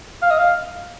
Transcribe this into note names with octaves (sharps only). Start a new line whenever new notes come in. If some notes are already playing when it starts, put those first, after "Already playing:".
F5
D#5
F5